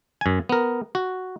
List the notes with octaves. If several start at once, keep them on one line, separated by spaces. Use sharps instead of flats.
F#2 G#5
B3 A#4
F#4